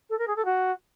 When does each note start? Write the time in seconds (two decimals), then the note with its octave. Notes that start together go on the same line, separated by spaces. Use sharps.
0.10 A4
0.19 A#4
0.27 G#4
0.36 A4
0.45 F#4